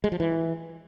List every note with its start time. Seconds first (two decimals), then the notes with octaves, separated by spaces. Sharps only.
0.04 G#3
0.12 F3
0.20 E3